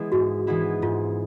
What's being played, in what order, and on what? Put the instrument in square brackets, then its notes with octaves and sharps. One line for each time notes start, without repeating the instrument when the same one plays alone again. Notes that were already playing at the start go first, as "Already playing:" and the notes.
Already playing: [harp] E3 G#3 B3 E4
[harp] G#2 [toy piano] F#4
[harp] E3 G#3 B3 E4
[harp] G#2 [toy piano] F4